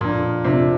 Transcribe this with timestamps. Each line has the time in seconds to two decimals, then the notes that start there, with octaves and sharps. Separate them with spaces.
0.01 F2 A#2 F3 D4
0.44 F2 C3 F3 D4